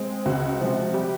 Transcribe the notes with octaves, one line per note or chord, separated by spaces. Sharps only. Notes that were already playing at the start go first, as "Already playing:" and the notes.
Already playing: G#3 C4
C#2 F#4
C3 F3 G#3
G3 G4